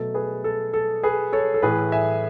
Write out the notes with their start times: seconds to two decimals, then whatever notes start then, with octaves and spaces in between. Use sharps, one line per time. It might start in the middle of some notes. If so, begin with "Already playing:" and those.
Already playing: B2 F#3 A3 A4
0.14 G#4 B4
0.44 A4
0.74 A4
1.03 G#4 B4
1.33 A4 C#5
1.54 A4
1.62 A2 E3 A3 G#4 B4
1.92 E5 G#5